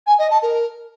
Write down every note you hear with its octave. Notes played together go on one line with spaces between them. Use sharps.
G#5
D#5
A5
A#4